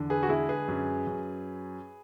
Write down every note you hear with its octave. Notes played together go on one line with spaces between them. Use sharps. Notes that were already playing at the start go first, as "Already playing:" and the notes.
Already playing: E2 D3
G#4 B4
F#4
G#3 E4 G#4
G#4 B4
F#2
F#2